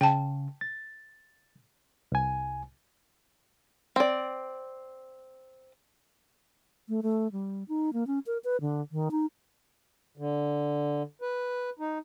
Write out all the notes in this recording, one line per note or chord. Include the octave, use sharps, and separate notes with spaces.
C#3 G5 A5
A6
C2 G#5
C4 D5
A3
A3
G3
D#4
A#3
C#4
A#4
B4
D3
D#3
D#4
D3
B4
D#4